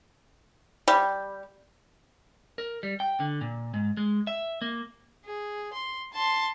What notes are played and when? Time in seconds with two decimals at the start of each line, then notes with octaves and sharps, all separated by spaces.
0.88 G3
2.58 A#4
2.83 G3
3.00 G5
3.20 D3
3.41 A#2
3.74 G#2
3.97 G#3
4.27 E5
4.62 A#3
5.26 G#4
5.73 C6
6.13 A5 C6